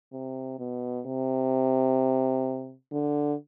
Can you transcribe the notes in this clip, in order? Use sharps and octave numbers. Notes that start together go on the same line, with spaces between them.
C3
B2
C3
D3